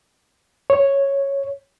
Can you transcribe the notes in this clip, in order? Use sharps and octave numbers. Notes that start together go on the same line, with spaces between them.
C#5